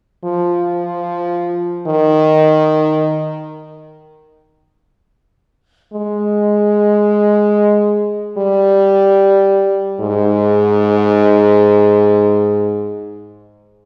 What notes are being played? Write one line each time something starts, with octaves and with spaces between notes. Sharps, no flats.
F3
D#3
G#3
G3
G#2